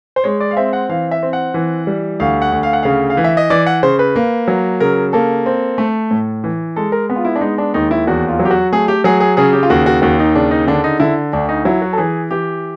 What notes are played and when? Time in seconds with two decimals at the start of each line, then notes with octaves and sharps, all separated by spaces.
0.16 C5
0.24 G#3 C#5
0.41 D5
0.51 F5
0.57 C4 E5
0.73 F#5
0.89 E3 F5
1.11 E5
1.23 C4
1.33 F#5
1.54 E3
1.87 G3
2.20 D2 F5
2.42 F#5
2.52 D2
2.63 F5
2.73 F#5
2.83 C#3 F5
3.10 F5
3.17 E3
3.24 E5
3.37 D#5
3.50 E3 D5
3.66 F#5
3.83 C#3 C5
3.99 B4
4.16 A#3
4.48 F#3
4.80 C#3 A#4
5.13 A#3 A4
5.46 C4
5.78 A3
6.11 A2
6.44 E3
6.76 G#3 A4
6.92 A#4
7.10 B3
7.16 F4
7.25 E4
7.36 D4
7.41 G#3 D#4
7.58 D4
7.74 D#2 D#4
7.91 E4
8.07 E2 F#4
8.29 F4
8.39 F#3
8.45 G4
8.51 F#4
8.72 A3 G#4
8.88 G4
9.04 F#3 G#4
9.20 G#4
9.37 C#3 G#4
9.53 G4
9.63 F4
9.70 D#2 F#4
9.86 F#4
10.02 D#2 F#4
10.19 D#4
10.35 C#3 D4
10.51 D#4
10.67 D3 D4
10.84 D#4
11.00 D3 E4
11.33 D2 D4
11.49 D#4
11.65 F#3 E4
11.82 F#4
11.93 A4
11.97 E3 G#4
12.31 E3 G4